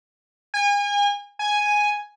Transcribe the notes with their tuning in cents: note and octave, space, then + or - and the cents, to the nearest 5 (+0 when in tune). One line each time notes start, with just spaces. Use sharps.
G#5 -35
G#5 +0